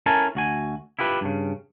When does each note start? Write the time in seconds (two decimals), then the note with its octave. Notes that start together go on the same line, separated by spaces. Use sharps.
0.06 C#4 E4 A4 A#4 G#5 A5
0.35 D2 F#4 G#5
0.99 E4 F4 G4 B4
1.21 G2 C#3